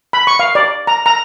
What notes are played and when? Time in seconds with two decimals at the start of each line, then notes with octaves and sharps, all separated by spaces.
0.13 B5
0.27 C#6
0.39 F5
0.55 D5
0.87 A#5
1.06 A#5